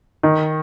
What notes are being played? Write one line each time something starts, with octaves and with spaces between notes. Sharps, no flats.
D#3